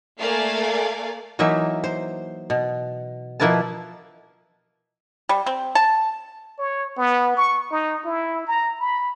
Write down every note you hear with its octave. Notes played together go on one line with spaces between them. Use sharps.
A3 A#3 A#4 D5 F5 G#5
E3 F#3 A#3 D#4 E5
C5
B2
B2 F3 A#3 E4 B4 A5
G3
C4
A5
C#5
B3
C#6
D#4
E4
A#5
B5